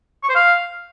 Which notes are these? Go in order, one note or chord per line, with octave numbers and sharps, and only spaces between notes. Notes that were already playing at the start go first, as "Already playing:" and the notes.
C#6
C5
F5